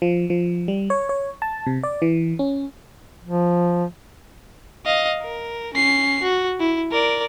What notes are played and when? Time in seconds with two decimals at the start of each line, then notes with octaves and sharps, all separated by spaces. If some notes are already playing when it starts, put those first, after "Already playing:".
0.02 F3
0.30 F3
0.68 G3
0.90 C#5
1.09 C#5
1.42 A5
1.66 C3
1.83 D5
2.02 E3
2.39 C#4
3.24 F3
4.85 D#5 F5
5.23 A#4
5.74 C#4 C7
6.22 F#4
6.60 E4
6.91 A#4 D5